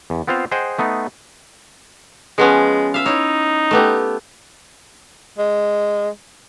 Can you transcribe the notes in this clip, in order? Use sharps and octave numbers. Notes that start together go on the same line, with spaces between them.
E2
B3 C4 F4 C5 F5
G#4 C5 D#5 F#5 G5
A3 B3 D#4
F3 G#3 B3 C#4
E5 F5
D#4 E4 C#5
A3 B3 G4
G#3